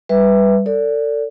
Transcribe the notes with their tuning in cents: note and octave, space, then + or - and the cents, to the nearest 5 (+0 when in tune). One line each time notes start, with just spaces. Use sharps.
G3 +15 B4 +0 E5 +0
A4 +35 D5 -20